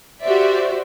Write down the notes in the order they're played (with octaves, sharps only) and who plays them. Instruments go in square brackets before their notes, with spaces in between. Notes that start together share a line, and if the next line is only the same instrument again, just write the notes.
[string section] F#4 G4 C5 D5 E5